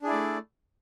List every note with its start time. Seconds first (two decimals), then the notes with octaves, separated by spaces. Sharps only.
0.02 D4
0.04 G#4
0.07 E4
0.10 D5
0.12 A3